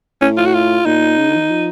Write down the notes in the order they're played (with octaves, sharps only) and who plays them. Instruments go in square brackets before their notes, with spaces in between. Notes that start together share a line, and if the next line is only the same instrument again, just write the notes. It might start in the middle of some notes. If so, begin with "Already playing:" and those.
[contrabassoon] A2 [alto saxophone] C#4
[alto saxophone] F4
F#4
F4
[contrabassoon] A#2 [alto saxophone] D#4
[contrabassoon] C#3
D3
E3
D#3
F3